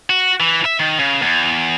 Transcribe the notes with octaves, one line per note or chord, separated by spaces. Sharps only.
F#4
E3
E5
D#3
C#3
E2